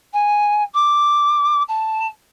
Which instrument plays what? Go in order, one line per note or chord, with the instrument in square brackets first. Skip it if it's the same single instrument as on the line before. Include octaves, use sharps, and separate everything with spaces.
[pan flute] G#5
D6
A5